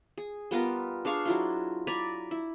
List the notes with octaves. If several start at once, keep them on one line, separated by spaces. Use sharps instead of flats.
G#4
G3 B3 F4 A#4
D4 G#4 F5 C#6
F#3 E4 F4
D5 G#5 A#5 B5
E4